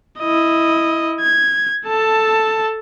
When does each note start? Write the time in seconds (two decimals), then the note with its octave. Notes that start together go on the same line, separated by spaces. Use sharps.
0.20 E4 D#5
1.20 G#6
1.87 A4 A5